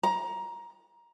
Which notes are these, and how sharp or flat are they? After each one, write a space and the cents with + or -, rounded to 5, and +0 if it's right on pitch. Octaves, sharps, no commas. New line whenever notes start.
A#5 +15